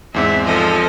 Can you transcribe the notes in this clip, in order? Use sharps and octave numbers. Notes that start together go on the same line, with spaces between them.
E2 G#2 C4 E5
F3 A4 D#5